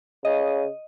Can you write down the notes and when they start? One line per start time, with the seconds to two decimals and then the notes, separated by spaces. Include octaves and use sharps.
0.25 C#3 D#5